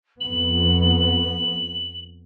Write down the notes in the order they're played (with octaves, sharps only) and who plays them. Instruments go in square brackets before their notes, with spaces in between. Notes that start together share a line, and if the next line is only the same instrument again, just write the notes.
[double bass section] F2 B3 [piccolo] F#7